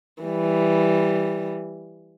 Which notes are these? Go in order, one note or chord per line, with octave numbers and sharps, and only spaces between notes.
E3 G3